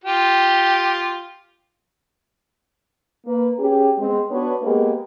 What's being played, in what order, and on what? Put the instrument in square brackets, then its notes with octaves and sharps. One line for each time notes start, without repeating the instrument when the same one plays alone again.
[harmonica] F4 G4
[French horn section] A#3 B4
C#4 G4 G#4
G#3 B3 C4
B3 D4 F#4 B4 C#5
G#3 A#3 B3 G4 G#4 A#4